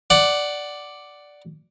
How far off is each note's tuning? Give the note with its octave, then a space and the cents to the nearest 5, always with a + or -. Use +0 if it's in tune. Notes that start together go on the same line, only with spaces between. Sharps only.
D5 +0 F#5 +10